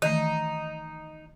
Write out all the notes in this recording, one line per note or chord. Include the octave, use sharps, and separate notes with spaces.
D#3 E3 A3 D#4